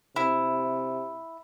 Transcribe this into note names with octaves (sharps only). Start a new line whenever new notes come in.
C3 E4